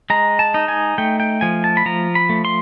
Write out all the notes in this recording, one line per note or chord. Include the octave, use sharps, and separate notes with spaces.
G#3 A#5
A5
D#4
G#5
A3 G5
G5
F3 G#5
A5
B5
F3 A#5
B5
A3
C6